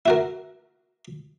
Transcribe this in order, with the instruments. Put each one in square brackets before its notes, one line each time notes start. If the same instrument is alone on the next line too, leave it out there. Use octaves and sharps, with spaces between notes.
[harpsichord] E4 F#4 A#4